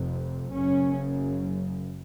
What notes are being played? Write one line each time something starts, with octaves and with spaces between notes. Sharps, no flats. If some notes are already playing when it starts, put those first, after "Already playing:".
Already playing: F1 F2 C3
F#1 F#2 C#3 C#4